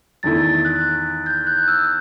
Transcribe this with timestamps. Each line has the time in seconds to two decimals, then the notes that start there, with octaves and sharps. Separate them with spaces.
0.23 E2 D#3 A3 E4 A6
0.65 F#6
1.26 G6
1.47 F#6
1.68 E6